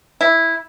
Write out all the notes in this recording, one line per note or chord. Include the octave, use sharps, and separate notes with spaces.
E4